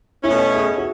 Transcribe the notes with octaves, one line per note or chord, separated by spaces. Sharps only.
B2 A3 C#4 E4
G#4
F#4